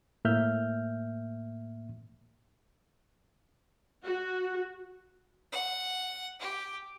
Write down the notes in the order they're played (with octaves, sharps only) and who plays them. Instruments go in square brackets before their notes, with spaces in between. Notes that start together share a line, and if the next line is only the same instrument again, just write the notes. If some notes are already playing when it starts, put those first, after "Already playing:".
[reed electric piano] A2 A#3 E5 F6 G6
[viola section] F#4
[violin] F#5
G4